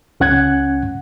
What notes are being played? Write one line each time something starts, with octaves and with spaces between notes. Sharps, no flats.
C#2 C#4 F#5 F#6 G#6